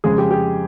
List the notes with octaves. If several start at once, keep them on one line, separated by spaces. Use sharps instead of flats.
F2 C#3 G#3 G#4
G4
G4